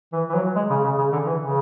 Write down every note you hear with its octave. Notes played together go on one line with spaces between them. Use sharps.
E3
E3
F#3
G#3
C#3
C#3
C#3
D3
E3
C#3